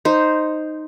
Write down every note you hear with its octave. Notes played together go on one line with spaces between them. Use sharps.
D#4 C5